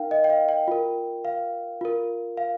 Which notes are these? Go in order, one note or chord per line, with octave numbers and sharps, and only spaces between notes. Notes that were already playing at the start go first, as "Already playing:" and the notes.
Already playing: D#4 A#4 F5 G5
D#5
G5
F5
G5
F4 A#4
F5
F4 A#4
F5